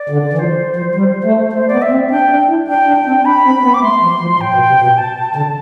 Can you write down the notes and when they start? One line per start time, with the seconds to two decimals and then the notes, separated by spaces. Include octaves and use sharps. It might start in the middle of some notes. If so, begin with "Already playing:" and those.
Already playing: D5
0.10 D3
0.33 E3
0.38 F3 C5
0.76 F3
0.95 G3
1.24 A3
1.53 A3 C5
1.67 B3 D5
1.81 E5
1.91 C4
2.10 D4 G5
2.30 D4
2.49 E4
2.68 D4 G5
2.87 D4
3.07 C4
3.25 D4 B5
3.45 C4
3.63 B3
3.73 D6
3.82 A3 C6
4.02 F3
4.21 F3
4.40 A2 G5
4.54 B2
4.69 C3
4.82 B2
4.97 A5
5.36 D3